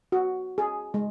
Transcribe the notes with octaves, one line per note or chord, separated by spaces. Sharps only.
F#4
G#4
G#3